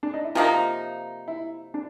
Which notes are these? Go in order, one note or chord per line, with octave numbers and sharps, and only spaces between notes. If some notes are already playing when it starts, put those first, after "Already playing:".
D4
D#4
E4
C3 F3 A#3 D#4 F4
E4
D4